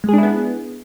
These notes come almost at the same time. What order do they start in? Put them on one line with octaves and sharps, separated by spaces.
G#3 G#4 D4 E4 B3